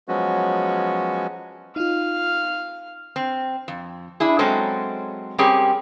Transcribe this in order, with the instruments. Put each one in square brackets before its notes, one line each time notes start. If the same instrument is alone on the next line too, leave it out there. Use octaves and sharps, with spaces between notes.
[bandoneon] F3 F#3 G#3 B3 C#4 F#4
[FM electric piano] D#4 F4 [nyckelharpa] F5
[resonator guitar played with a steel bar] C4
F2
D4 E4 G#4
F#3 G#3 C4 C#4 A4
G3 C4 C#4 G4 G#4 A#4